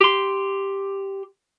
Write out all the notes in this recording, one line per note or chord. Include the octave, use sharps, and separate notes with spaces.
G4 C6